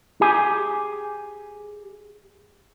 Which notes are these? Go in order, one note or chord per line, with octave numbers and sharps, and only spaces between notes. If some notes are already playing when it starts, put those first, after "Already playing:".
G4 G#4 G#5